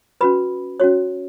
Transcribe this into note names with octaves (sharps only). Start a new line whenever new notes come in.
C#4 F#4 B4 B5
C#4 F#4 C#5